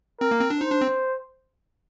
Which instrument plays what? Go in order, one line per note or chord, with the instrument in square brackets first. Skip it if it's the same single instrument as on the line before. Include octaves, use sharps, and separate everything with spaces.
[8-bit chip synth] C4 [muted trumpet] A#4
[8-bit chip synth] A#3
C4
D4
[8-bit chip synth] D#4 [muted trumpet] C5
[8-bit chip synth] D4
C4